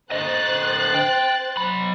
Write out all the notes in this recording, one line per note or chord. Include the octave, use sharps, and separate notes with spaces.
D3 C5 D#5 F#6 A6
G5
F#3 B5